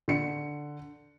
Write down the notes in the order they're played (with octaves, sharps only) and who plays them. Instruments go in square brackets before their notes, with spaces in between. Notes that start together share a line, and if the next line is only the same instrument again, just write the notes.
[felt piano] D3 C#7